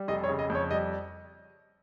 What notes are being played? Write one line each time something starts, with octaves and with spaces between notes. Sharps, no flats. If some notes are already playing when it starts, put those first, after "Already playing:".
Already playing: G3
F1 D#5
C#5
C#3
D#5
F2
C#5
G3 D#5